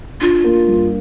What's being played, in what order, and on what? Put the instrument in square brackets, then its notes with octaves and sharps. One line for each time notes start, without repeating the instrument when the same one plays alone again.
[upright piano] D4 [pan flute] F4
[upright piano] A#3
G2